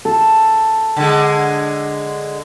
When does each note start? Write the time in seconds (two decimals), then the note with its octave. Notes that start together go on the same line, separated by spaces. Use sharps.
0.05 A4
0.97 D3 G#3